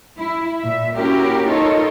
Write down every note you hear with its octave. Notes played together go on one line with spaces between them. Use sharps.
E4
A#2 E5
A#3 C#4 E4 F#4 G4 A#4
D#4 F4 A4 A#4 C#5 D#5